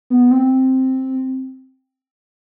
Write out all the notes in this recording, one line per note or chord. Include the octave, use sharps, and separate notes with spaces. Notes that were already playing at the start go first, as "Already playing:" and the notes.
B3
C4